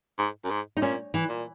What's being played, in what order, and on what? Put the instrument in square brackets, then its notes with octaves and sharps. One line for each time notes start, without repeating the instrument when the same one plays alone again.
[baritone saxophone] G#2
F#2
G#2
[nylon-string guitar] D#4
[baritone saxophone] A#2 [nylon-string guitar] C#4
[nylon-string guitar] E3
[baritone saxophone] A#2